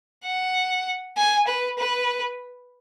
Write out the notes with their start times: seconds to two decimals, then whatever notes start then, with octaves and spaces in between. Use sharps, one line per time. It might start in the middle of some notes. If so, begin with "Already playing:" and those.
0.24 F#5
1.17 G#5
1.47 B4
1.78 B4